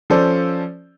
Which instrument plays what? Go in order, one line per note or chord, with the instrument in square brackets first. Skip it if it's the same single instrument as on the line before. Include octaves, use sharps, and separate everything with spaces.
[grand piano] F3 C#4 A4 C5 D5